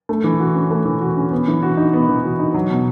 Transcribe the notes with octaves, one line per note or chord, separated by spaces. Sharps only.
A3
E3
F#4
C#4
A3
E3
F#4
C#4
B3
E3
F#4
D#4
B3
E3
F#4
D#4
F#3
B2